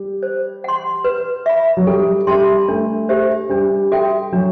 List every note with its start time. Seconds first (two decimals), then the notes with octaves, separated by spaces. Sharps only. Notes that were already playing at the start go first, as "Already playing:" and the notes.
Already playing: G3
0.23 C5
0.64 F#5 C6
1.04 B4
1.46 E5 B5
1.77 F#3
1.87 G3 A4
2.27 G3 E5 A5 C6
2.68 A3 D4
3.09 G4 C5 E5
3.50 G3 D4
3.92 F#4 A4 E5 G5
4.32 F#3 D4